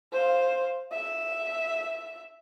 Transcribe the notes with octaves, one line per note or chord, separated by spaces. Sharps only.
C5 F5
E5